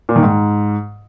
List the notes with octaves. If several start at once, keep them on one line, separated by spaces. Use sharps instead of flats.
A#2
D#3
G#2